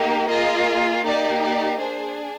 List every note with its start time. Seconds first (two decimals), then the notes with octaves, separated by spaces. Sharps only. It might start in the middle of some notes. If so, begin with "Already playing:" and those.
Already playing: A#3 D#4 G4
0.29 A#3 F4 G#4 D#5
1.04 A#3 D#4 G4 D5
1.42 D5
1.79 D4 G#4 C5